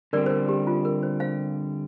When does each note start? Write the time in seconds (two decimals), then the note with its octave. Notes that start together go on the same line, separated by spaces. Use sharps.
0.13 D3 G3 C4 A#4 D5
0.26 C5
0.31 A#4
0.49 G4
0.67 F4
0.85 A#4
1.03 C5
1.20 C5 F5